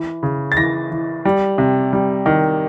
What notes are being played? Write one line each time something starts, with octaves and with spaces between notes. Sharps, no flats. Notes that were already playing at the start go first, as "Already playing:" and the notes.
Already playing: E3
C#3
A6
E3 A#6
E3
G3
C3
G3
D#3